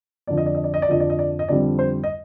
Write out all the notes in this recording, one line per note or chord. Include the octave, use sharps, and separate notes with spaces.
F2 D3 F3 D5
D#5
D5
D#5
D5
D#5
D5
F2 D3 F3 D#5
D5
D#5
D5
D#5
F2 D3 G3 C4 D5
C5
D#5